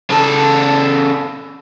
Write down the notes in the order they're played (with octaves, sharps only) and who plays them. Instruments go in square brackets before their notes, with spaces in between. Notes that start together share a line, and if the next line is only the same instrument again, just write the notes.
[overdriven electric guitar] C#3 A4